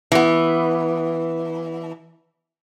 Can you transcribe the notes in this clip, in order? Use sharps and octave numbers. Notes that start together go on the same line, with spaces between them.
E3 B3